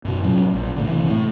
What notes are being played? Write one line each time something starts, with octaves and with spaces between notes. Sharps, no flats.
F#2 B2
A#2 F#3 C#4
A#1
A2 D3
C3 E3
A2